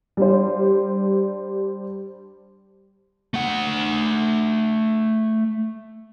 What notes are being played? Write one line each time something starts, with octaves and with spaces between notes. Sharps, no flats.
G3 D4 C5
A3 F#5